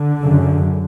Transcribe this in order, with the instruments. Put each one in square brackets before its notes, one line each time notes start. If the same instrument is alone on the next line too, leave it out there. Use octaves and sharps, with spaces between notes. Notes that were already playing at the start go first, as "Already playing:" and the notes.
Already playing: [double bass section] D3
F#2 C#3